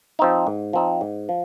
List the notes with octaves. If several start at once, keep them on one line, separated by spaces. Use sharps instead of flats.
F3 C4 D#4
G#2
F3 C4 D#4
G#2
F3